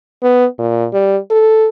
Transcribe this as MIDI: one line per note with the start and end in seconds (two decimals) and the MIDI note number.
0.22 0.45 59
0.58 0.87 46
0.93 1.18 55
1.31 1.68 69